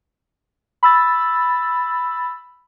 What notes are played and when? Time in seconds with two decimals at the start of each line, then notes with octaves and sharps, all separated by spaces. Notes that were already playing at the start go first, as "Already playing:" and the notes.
0.83 B5 E6 A6